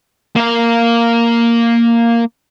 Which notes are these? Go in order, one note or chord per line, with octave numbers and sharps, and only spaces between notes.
A#3 F5